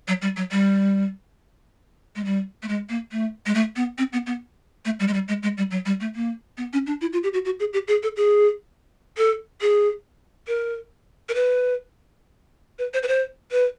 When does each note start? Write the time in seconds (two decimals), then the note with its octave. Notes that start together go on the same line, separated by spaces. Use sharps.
0.08 F#3
0.22 G3
0.37 F#3
0.51 G3
2.16 G#3
2.25 G3
2.63 A3
2.68 G#3
2.89 A#3
3.12 A3
3.46 G#3
3.55 A3
3.76 B3
3.98 C4
4.13 B3
4.26 B3
4.85 A3
5.00 G3
5.08 G#3
5.14 G3
5.28 G#3
5.43 G#3
5.58 G3
5.71 F#3
5.86 G3
6.00 A3
6.15 A#3
6.57 B3
6.73 C#4
6.87 D4
7.01 E4
7.13 F4
7.23 G4
7.33 F#4
7.45 F#4
7.60 G#4
7.73 G4
7.88 G#4
8.03 A4
8.17 G#4
9.17 A4
9.61 G#4
10.48 A#4
11.29 A#4
11.35 B4
12.79 B4
12.94 C5
13.03 B4
13.08 C5
13.52 B4